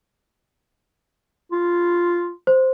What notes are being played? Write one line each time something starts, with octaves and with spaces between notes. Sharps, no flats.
F4
C5